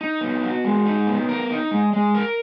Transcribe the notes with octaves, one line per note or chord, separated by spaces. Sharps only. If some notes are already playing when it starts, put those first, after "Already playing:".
D#4
B3
F#4
G#3
D#4
B3
A#4
D#4
G#3
G#3
A#4